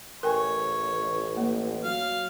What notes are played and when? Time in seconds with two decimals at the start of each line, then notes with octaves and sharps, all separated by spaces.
0.23 A1 A#4 C#5 G5 G#5
1.37 A#3
1.85 F#3 F5